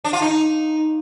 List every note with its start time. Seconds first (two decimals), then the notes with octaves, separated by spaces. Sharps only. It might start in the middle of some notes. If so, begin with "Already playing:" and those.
0.04 D4
0.13 F4
0.21 D#4